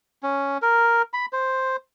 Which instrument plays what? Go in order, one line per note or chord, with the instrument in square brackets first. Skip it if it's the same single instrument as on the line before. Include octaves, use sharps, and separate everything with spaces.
[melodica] C#4
A#4
B5
C5